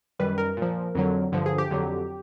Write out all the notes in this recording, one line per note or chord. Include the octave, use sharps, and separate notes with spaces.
F#2 D#3 G3 B4
A#4
A#2 F3
F2 D3 F#3
G2 D3 F3
G#4
G4
F2 D3 F#3